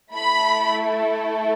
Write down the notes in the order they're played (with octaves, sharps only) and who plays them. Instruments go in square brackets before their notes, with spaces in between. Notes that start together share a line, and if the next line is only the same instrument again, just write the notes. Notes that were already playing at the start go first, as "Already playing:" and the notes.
[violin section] A3 E4 A4 B5